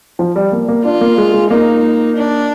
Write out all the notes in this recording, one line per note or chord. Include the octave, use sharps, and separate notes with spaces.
F3
G3
A#3
A#3
D4 F4
A#3
G#3
G#3
A#3 D#4
D4